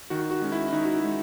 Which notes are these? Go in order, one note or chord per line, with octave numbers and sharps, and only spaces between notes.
D#3 F#4
F#4
G#3 C#4
E4
D#3 D#4
F#4
E4
G#3